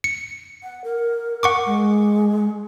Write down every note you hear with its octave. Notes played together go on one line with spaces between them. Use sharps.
C#7
F#5
A#4
F#5 C#6 D6
G#3